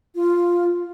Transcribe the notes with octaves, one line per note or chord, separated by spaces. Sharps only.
F4